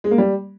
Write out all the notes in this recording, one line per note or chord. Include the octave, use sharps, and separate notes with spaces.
G#3
A#3
G3